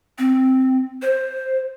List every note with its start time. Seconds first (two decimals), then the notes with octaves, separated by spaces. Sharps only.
0.18 C4
1.02 C5